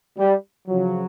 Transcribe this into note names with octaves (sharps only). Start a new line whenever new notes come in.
G3
C#3 F3 F#3